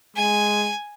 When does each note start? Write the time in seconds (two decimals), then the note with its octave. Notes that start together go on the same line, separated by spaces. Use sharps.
0.17 G#3 G#5